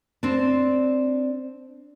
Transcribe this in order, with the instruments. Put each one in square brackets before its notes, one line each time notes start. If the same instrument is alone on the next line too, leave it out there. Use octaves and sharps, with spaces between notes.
[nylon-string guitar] C4 D4